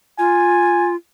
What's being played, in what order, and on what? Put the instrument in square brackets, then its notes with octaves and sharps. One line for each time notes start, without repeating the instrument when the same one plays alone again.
[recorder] F4 [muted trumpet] G#5